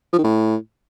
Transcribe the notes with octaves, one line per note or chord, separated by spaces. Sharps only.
F3
D#3
A2